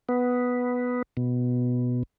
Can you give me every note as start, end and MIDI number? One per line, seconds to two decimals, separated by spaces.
0.09 1.02 59
1.17 2.03 47